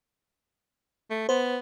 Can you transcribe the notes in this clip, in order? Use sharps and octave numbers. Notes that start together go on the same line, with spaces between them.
A3
B3 C5